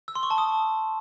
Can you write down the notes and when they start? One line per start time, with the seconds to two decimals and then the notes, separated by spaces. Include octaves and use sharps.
0.08 E6
0.15 C6
0.23 C#6
0.31 A5
0.38 D#6